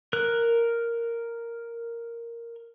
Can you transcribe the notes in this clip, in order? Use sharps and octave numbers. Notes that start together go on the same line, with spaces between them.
A#4 F#6